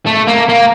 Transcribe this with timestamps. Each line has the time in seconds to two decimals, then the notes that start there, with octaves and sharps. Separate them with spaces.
0.07 A3
0.28 A#3
0.49 A#3